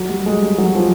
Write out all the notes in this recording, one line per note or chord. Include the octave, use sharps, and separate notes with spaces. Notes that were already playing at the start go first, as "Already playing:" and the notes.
Already playing: F#3
G3
G#3
G3
F#3
F3